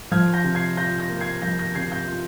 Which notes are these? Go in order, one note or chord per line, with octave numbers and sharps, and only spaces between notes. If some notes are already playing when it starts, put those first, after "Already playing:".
F3 F6 G#6
G6 A#6
C3
G#6 C7
F4 G6 A#6
G6 A#6
A#3
G#6 C7
F3 G6 A#6
G6 A#6
C3 G#6 C7
G6 A#6
F4